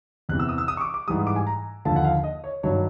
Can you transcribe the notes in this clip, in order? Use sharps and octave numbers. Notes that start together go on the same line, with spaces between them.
E2 C3 E3 F#6
E6
D#6
E6
D#6
C#6
D6
D6
G#2 E3 G3 D#6
D6
G#5
A#5
D#2 D3 F3 A5
F#5
F5
D#5
C#5
G2 D#3 F#3 C#5